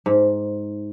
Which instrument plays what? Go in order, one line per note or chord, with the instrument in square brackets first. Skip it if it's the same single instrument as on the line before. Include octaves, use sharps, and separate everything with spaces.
[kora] G#2